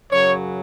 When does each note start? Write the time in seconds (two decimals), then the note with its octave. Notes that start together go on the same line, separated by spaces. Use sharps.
0.12 F#2 C#3 F#3 C#5